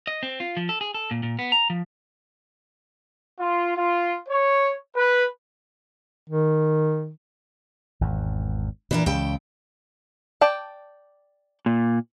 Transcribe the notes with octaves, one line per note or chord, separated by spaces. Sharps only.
D#5
C4
F4
F3
A4
G#4
A4
A#2
A#2
B3
A#5
F3
F4
F4
C#5
B4
D#3
G#1 E2
A#2 E3 D4 A#4
C#2 C#3 A4 G5
D5 G5 A5
A#2